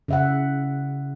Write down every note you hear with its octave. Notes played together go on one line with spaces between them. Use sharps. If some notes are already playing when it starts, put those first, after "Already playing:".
C#3 E5 F#5